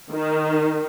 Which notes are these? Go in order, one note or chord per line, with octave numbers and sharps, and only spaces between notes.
D#3